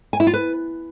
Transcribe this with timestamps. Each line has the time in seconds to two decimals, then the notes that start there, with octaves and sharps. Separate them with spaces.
0.13 G#5
0.20 E4
0.27 F4
0.34 B4